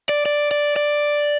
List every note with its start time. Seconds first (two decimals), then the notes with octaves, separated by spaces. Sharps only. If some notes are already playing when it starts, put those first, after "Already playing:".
0.09 D5
0.26 D5
0.51 D5
0.76 D5